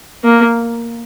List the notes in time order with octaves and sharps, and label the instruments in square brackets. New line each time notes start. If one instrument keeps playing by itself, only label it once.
[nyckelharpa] A#3